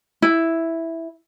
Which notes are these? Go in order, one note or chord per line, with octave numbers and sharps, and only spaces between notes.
E4